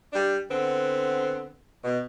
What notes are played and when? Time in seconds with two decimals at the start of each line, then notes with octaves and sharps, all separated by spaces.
0.13 G3 D4
0.50 D3 B3 C4
1.84 B2